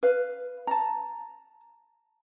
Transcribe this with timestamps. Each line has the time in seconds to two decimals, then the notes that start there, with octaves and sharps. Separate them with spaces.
0.03 B4 F5
0.67 A5 A#5